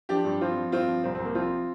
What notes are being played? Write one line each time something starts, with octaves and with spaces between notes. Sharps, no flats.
F3 D4 G4
G2
F3 C4 F4
F3
G2 C4 F4
F3
C2 C4
C4
C2
A#3
F3 C4 F4